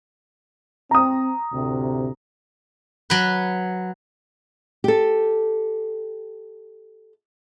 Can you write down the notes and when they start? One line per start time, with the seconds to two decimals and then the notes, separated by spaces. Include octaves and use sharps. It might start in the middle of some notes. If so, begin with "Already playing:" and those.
0.91 C4 A#5 D#6
1.53 D2 A2 C3
3.10 F#3 B4
4.84 G4 A4